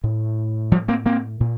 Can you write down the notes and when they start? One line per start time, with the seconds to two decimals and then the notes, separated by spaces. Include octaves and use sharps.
0.04 A2
0.72 F3 G3
0.88 A#3 C4
1.06 A#3 C4
1.40 A#2